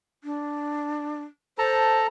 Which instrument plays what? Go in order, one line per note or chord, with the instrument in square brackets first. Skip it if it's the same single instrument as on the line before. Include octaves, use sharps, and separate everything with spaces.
[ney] D4
[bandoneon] A4 A5 A#5 [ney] C5